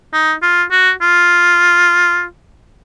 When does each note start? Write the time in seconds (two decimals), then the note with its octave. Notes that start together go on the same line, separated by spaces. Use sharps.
0.13 D#4
0.43 F4
0.71 F#4
1.02 F4